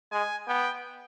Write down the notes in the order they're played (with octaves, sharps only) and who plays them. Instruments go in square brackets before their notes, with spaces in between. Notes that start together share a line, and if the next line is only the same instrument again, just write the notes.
[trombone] G#3 [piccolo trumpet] G#5
[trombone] B3 [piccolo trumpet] G5